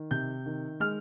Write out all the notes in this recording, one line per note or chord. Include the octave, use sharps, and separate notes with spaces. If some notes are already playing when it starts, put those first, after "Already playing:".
Already playing: D#3
C3 G6
D#3
G#3 F6